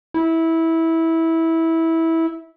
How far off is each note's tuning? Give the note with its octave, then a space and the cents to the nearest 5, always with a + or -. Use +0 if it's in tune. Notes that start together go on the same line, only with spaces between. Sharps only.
E4 -15